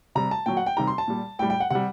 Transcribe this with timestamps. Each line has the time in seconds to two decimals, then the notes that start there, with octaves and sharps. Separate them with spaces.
0.15 C3 G3 A#5
0.31 A5
0.46 A#2 F#3 G5
0.57 F#5
0.67 G5
0.77 C3 D#3 G3 A#5
0.87 C6
0.98 A5
1.08 A#2 G3
1.39 A2 G5
1.42 G3
1.50 G5
1.60 F#5
1.70 C3 G3 F#5